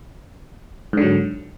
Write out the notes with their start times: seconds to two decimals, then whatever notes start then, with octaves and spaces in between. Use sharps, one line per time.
0.93 G#2
0.97 D3
1.02 F#3